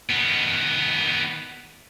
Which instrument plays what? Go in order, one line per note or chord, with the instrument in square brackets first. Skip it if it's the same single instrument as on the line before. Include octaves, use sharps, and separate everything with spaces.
[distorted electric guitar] D#3 B3